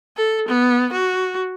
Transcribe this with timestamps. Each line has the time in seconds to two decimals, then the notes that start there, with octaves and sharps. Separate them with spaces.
0.16 A4
0.48 B3
0.92 F#4